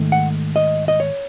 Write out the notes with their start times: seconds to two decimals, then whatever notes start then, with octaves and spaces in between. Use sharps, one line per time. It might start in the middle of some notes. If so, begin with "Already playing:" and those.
Already playing: G#2 D#3 A3
0.12 F#5
0.56 D#5
0.88 D#5
1.00 C#5